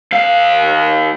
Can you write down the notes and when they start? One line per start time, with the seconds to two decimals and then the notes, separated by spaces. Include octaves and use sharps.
0.12 D#2 F5